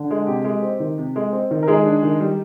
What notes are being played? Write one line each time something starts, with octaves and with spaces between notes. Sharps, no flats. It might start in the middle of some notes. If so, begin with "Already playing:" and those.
Already playing: D3
G#3
C3 G4
G#3
C4
D#3
C3
G#3
C4
D#3
A#4
D#3 G#3 G#4
D4
D#3
G3